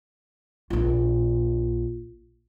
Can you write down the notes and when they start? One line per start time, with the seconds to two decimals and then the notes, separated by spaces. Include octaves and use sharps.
0.70 A#1 F4